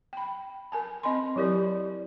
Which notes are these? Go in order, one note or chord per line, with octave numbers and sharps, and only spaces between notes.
G5 B5
A#4 G#5 A5
C4 D#5 G#5 B5 C6
F#3 E4 G4 A#4 D5